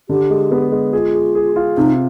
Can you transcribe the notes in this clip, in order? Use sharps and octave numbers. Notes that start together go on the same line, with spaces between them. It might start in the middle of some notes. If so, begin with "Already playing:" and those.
D3 G4
G#3
B3
G#3
F4 G#4
G#4
G#4
F4
C3 D#4